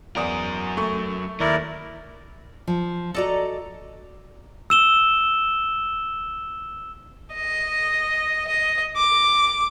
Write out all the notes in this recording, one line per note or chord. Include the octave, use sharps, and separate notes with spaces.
E2 F#3 A#4 D5 D#6
A3 C#6
D#2 E4 A#4 D5
F3
F#4 A4 D5 D#5 A#5
E6 E7 G7
D#5
D#5
D6